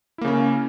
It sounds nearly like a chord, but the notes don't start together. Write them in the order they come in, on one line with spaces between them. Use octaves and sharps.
E4 A#3 C#3 C#4